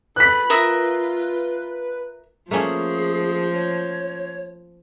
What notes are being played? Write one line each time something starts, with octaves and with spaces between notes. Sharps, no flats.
A4 B4 B5 F#6 B6
F4 A#4 E5 D#6
F3 A3 A#3 C#4 G#4
C#5